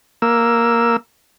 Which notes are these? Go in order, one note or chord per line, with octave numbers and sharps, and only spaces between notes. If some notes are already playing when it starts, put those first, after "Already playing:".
A#3 E6